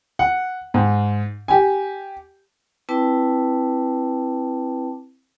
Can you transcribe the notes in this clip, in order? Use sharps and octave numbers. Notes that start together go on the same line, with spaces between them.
F#5
G#2
G4 G#5
C4 E4 B4 G5 A5 D6